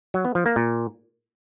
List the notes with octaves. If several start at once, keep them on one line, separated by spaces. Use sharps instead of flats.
F#3
B3
F3
A#3
A#2